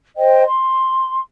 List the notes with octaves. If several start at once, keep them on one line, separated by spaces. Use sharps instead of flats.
C5 D#5 G5
C6